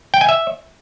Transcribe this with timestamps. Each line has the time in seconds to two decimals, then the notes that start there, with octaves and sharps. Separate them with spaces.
0.14 G5
0.21 G#5
0.29 E5